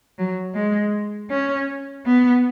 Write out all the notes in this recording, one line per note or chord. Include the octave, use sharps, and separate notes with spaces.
F#3
G#3
C#4
B3